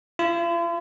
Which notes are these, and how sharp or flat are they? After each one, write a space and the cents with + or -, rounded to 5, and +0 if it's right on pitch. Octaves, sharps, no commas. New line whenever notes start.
F4 -45